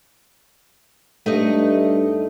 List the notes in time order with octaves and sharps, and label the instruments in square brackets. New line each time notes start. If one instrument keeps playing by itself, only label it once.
[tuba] G2 [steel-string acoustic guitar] A3 D#4 D#5